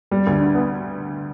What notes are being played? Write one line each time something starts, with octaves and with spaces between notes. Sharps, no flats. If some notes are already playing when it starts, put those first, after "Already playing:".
G3
D2
D3
B3